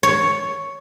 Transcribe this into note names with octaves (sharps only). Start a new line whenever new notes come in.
C#5